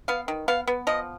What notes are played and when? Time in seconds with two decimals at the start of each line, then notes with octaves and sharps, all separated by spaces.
0.08 B3 F5
0.28 D#3
0.48 B3 F5
0.67 B3
0.87 F3 D#5